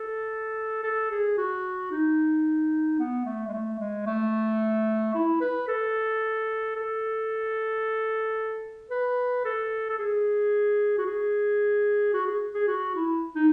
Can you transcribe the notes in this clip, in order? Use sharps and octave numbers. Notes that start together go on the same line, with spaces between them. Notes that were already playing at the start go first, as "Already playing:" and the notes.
Already playing: A4
A4
G#4
F#4
D#4
B3
A3
G#3
A3
G#3
A3
E4
B4
A4
A4
B4
A4
A4
G#4
F#4
G#4
F#4
G#4
G#4
F#4
E4
D#4